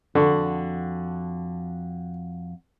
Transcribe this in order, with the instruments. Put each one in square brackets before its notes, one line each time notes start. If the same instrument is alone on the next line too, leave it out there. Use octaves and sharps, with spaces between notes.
[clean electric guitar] F2 F#4 [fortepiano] D3